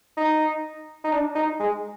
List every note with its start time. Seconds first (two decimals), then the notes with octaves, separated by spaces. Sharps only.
0.17 D#4
1.04 D#4
1.12 D4
1.35 D#4
1.60 G#3